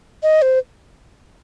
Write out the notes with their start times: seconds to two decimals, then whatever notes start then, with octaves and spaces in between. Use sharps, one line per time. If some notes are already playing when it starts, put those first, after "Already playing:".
0.23 D#5
0.42 C5